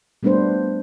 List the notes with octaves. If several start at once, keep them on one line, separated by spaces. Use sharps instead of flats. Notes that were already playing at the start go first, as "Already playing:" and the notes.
G3 A3 B3 D4 B4 C5